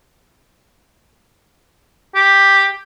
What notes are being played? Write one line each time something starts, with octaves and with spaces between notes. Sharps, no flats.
G4